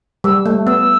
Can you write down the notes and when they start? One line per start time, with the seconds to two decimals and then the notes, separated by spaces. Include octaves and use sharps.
0.24 G3 E6
0.46 A3
0.67 B3 E6